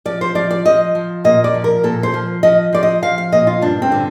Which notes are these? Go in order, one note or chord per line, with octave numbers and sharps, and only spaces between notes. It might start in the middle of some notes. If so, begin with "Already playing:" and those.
F3 D5
C5
F3 D5
D5
F3 D#5
F3
A#2 D#5
D5
F3
A#4
A#2 A4
C5
F3
F3 D#5
F3 D5
D#5
F3 F5
F5
A#2 D#5
F4
G2 D4
C4
D3